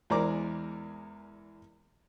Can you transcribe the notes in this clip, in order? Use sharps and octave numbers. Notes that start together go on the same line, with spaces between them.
E2 G#3 A#4 D5 A#5 D6